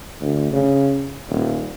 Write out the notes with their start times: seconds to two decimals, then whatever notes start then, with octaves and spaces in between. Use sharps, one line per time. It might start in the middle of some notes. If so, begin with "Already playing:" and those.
0.21 D2
0.52 C#3
1.29 D#1